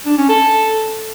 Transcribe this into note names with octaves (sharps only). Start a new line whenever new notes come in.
D4
C#4
A4